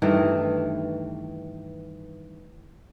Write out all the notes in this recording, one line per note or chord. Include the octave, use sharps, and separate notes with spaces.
G2 D#3 E3 A3